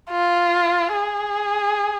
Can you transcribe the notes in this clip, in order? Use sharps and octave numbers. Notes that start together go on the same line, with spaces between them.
F4
G#4